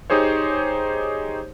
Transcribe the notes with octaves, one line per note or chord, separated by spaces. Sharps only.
D#4 G4 G#4 C5 C#5